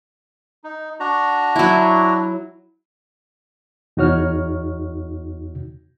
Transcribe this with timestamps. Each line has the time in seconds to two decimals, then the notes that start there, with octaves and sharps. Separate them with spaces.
0.64 D#4
1.00 D4 F#4 A#5
1.56 F#3 E4
3.97 E2 D#4 F#4 C#5 F6